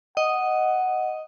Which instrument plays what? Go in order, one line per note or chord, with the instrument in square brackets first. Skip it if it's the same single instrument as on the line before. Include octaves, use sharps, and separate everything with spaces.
[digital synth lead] D#5 [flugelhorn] F#5